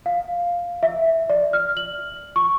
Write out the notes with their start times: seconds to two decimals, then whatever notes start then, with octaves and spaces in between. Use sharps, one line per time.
0.06 F5
0.83 E5
1.30 D5
1.53 F6
1.77 F#7
2.36 C#6